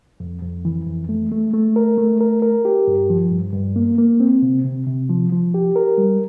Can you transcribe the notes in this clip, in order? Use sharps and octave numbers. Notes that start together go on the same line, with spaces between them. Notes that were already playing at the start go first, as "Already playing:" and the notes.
F2
F2
E3
F2
A3
A3
A3
A#4
A3
A#4
A#4
G4
G2
F3
G2
G2
A#3
A#3
C4
C3
C3
C3
F3
F3
G4
A#4
G3